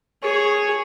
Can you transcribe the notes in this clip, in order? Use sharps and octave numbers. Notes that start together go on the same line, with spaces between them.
G#4 C#5